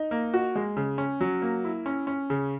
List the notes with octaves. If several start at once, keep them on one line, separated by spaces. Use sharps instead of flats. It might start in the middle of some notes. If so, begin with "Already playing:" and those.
Already playing: D#4
A#3
F#4
G#3
C#3
C#4
F#3
A#3
E4
C#4
C#4
C#3